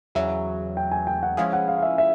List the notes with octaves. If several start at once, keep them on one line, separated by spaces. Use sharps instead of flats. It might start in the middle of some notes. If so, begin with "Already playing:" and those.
E2 C#3 F#3 E5
G5
G#5
G5
F#5
F3 G#3 C#4 E4 G#4 F5
F#5
F5
F5
E5
E5